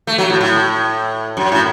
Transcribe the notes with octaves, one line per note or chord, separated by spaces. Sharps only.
A3
F#3
A2
A2
F#2
A2